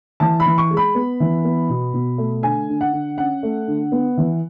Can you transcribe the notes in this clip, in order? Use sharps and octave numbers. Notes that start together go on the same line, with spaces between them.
E3 A5
B5
E3
C#6
G#3
B5
B3
E3
B3
B2
B2
A3
D3 G#5
D3
F#5
D3
C#4 F#5
A3
D3
B3
E3